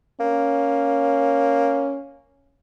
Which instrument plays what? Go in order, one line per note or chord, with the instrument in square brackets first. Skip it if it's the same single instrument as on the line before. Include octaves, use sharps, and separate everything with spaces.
[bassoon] A#3 [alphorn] C#4